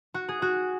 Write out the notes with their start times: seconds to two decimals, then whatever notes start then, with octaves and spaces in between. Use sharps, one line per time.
0.14 F#4
0.29 G#4
0.42 F#4